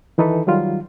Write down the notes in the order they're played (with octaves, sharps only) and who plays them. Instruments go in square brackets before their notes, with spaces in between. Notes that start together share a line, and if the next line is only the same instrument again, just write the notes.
[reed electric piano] D#3 E3 D#4 A4 B4
D#3 F#3 G3 F4